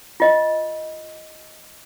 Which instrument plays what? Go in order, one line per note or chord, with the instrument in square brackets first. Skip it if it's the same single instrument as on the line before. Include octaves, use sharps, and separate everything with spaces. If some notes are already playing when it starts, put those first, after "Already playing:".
[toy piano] F4 D#5